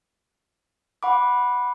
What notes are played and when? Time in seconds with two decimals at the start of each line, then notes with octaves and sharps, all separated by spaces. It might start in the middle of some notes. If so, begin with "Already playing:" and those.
1.03 F#5 B5 D6